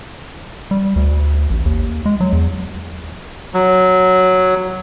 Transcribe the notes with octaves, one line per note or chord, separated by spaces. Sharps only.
G3
D2
A1
D#2
G#3
F#3
E2
F#3